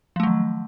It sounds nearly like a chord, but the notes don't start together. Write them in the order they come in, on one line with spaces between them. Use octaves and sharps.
F3 A3 F#3 D#3